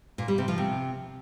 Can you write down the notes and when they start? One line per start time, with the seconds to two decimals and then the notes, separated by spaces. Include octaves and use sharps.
0.18 A#2
0.28 G3
0.38 C3
0.48 F3
0.58 C3